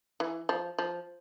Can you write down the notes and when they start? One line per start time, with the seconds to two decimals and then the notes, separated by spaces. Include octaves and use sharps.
0.20 E3
0.49 F3
0.78 F3